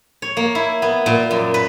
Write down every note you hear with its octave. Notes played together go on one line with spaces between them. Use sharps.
C#5
A#3
E4
B3
A#2
F#2
B4